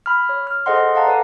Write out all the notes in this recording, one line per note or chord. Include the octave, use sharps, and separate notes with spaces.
B5 F6
C#5
F6
G#4 A4 C5 D#5 F#5 C6
F5 F#5 A5 A#5
A4 B4 D5